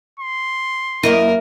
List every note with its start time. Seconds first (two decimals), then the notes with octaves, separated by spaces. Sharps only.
0.19 C6
1.03 F#2 A#3 E4 A#4 D#5